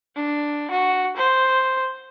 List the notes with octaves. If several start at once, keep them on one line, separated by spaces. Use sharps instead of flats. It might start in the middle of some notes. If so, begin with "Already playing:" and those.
D4
F#4
C5